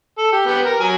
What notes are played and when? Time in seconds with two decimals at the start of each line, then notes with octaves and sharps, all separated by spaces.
0.18 A4
0.33 G4
0.47 B3 G4
0.65 A#4
0.80 F#3 G#5